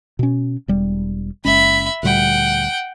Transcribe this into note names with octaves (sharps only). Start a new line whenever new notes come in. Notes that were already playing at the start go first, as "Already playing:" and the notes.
B2 C#4
E1 G3
F#1 G#3 C#4 E5 B5
D2 A#2 G3 F#5 G5